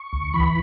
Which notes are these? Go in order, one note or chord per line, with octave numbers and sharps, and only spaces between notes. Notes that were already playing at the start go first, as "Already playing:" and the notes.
Already playing: C#6
D2
E3 B5